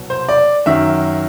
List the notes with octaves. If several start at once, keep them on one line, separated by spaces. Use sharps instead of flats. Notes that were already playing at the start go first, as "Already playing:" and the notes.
Already playing: C2 B2 F#3
C5
D5
F#2 D#3 F#3 E5